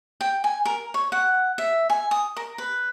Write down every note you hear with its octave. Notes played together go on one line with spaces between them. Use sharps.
G5
G#5
A#4
C#5
F#5
E5
G#5
D#6
A#4
B4